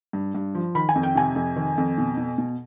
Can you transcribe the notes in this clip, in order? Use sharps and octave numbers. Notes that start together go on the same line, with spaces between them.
G2
G2
F3
D#3 B5
G#5
F2
G5
C3 G#5
F2
D#3
F2
B2
B2
B2